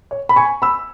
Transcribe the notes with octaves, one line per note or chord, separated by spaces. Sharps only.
C#5
B5
G#5 C#6
B5 E6